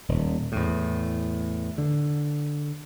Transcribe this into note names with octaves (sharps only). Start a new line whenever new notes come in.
D#1
E2 A2
D3